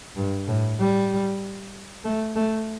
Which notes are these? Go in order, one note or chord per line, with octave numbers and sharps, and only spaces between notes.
G2
A2
G3
A3
A3